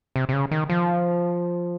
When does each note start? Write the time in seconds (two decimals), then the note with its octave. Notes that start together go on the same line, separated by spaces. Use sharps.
0.16 C3
0.29 C3
0.33 C#3
0.51 D#3
0.70 F3